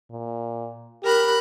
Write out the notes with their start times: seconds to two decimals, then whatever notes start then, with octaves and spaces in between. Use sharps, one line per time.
0.11 A#2
1.04 G4 A#4 B5 F#6